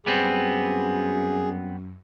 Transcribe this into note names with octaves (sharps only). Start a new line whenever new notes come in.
F#2 G3 B3 C4 G#4